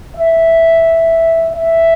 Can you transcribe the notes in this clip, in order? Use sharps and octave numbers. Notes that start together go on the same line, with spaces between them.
E5
E5